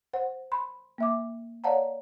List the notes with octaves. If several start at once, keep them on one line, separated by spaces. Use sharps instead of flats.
C5 F#5
B5 C6
A#3 E5 D6
C#5 D5 F5 F#5 A5 A#5